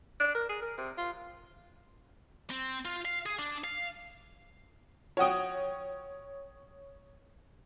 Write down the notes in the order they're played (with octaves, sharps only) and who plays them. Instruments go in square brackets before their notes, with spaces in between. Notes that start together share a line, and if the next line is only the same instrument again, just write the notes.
[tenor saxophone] D4
A#4
G#4
A#4
C3
F4
[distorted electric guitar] C4
F4
F5
G#4
D4
F5
[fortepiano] F3 F#4 G5 [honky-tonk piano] C#5 D#6